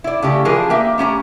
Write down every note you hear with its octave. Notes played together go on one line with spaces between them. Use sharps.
E4 D5
C#3 A3 G4
E3 F3 D4 G#4 A#4
A#3 G4 E5
A3 C#4 G4 A#5